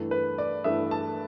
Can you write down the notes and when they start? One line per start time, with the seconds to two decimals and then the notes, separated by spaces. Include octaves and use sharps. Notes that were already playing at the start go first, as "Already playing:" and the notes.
Already playing: G2 E3 A3
0.11 B4
0.38 D5
0.64 G2 E3 A3 E5
0.91 A5